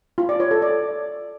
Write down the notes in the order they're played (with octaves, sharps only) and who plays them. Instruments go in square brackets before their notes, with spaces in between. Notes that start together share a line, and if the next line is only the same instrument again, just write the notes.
[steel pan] F4
D5
C#5
A4
D5